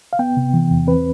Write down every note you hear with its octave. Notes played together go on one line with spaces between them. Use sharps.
F5
B3 G5
C3
E3
E2
C4 B4